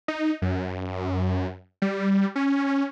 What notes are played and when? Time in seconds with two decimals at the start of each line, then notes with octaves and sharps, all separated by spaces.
0.08 D#4
0.42 F#2
1.82 G3
2.36 C#4